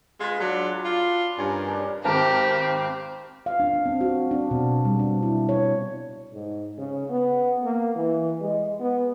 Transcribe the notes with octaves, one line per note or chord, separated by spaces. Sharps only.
G#3 F4 B4
F#3 D4
F4
G2 C#4 A#4
C#3 D4 A#4
G#1 C4 G4 A#4 A5
F5
D4
D4
C4
F#4
D4
B2
G3
D4
E4
C#5
G#2
C#3
B3
A#3
E3
G#3
B3